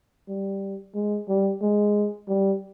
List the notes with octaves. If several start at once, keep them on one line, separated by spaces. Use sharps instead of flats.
G3
G#3
G3
G#3
G3